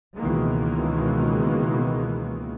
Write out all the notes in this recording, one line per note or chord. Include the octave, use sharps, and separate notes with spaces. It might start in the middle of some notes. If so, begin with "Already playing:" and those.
C#2 B2 D#3 E3 G#3 A#3